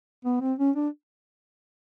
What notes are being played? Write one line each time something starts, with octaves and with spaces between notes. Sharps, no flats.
B3
C4
C#4
D4